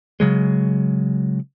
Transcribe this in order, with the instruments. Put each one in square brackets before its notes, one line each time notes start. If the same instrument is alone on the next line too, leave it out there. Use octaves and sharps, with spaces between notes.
[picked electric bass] C#3 F#3 G#3